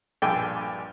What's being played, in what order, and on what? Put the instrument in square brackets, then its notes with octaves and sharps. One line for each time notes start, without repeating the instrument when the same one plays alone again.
[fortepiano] A#1 G2 A4 G5 G#5 D6